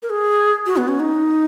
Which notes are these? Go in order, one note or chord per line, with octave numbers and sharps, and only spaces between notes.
A#4
G#4
F#4
B3
C#4
D#4